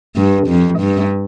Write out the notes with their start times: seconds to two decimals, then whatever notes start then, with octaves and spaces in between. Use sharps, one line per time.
0.16 G2
0.47 F2
0.79 G2